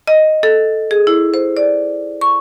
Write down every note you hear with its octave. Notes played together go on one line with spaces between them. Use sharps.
D#5
A4
G#4
E4
C5
D5
C#6